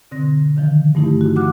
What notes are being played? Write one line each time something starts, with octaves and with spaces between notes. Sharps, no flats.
B2 D3 C4 A#6
D3 D#3 F3
G2 A3 D#4 E4 G4
F#4
E3 F3 F#5 D6 F6 F#6